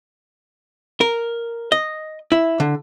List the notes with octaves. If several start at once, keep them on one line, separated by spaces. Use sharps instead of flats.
A#4
D#5
E4
D3